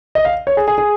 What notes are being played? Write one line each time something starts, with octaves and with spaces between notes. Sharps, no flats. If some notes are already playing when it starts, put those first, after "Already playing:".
D#5
F5
C#5
G#4
G#4
G#4